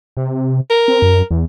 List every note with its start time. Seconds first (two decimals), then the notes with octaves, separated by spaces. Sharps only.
0.17 C3
0.70 A#4
0.88 C4
1.02 F#2
1.31 E2